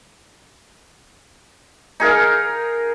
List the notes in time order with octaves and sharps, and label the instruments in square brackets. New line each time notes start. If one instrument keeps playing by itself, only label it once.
[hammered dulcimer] D#4 G#4 A#4 F5